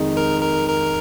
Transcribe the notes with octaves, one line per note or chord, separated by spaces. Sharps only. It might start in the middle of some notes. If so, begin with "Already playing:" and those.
Already playing: F2 D#3 G#3 D#4
A#4
A#4
A#4